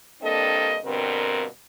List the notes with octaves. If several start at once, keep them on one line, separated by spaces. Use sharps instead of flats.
G2 A#3 C4 D4 A4 D#5
G2 B2 D3 C4 A#4